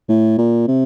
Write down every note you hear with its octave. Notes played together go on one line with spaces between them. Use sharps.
A2
A#2
C3